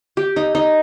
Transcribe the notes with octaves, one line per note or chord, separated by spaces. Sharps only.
G4
D#4
D#4